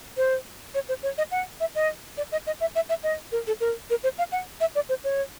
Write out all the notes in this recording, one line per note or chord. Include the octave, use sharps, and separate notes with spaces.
C5
C#5
C5
C#5
D#5
F#5
E5
D#5
D5
D#5
D#5
E5
E5
E5
D#5
A#4
A4
A#4
A#4
C5
F5
F#5
E5
D5
C5
C#5